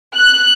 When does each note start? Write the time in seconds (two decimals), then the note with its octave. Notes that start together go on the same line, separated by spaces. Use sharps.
0.16 F#6